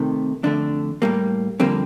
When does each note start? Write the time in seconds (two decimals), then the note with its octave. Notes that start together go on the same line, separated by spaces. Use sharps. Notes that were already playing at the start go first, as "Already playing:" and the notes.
Already playing: C3 D#3 A3
0.43 F2 D3 A3 D4
1.02 A2 G3 A#3
1.60 F2 D3 G3 A#3 C4